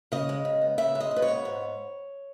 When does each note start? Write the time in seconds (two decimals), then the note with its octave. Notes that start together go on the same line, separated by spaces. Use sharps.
0.12 C#3 D#5
0.29 G#3
0.45 C#3
0.61 B3
0.78 C#3 E5
0.95 G#3
1.00 D#5
1.11 C#3
1.16 B4
1.22 C#5
1.28 B3
1.45 G#2